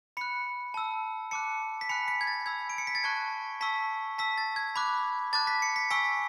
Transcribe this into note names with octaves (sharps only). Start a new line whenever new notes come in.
B5 F#6 C#7
A5 E6
A5 D6 F#6 C#7
B6
G#5 B5 F#6 C#7
B6
G#6
A6
B5 E6 G#6
D7
C#7
B6
A6
A5 C#6 F#6 G#6
A5 C#6 E6 B6
A5 E6 B6
A6
G#6
B5 D6 F#6 G#6
A5 D6 F#6 A6
B6
C#7
B6
G#5 C#6 E6 B6